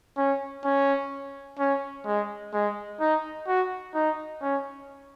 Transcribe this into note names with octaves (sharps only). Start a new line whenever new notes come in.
C#4
C#4
C#4
G#3
G#3
D#4
F#4
D#4
C#4